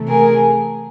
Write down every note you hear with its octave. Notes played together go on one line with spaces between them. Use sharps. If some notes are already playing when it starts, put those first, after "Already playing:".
Already playing: C3 E3 A3
G#4 A#4